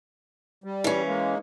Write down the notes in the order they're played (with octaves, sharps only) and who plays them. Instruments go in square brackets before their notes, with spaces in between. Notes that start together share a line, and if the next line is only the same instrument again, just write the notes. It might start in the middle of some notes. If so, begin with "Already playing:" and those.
[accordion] G3
[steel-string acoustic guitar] E3 C#4
[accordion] G#3 A#3